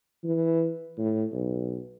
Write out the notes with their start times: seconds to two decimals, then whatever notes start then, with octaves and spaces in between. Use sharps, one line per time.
0.24 E3
0.98 A2
1.32 B1